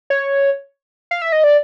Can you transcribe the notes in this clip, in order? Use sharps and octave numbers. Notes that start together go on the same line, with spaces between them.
C#5
F5
E5
D#5
D5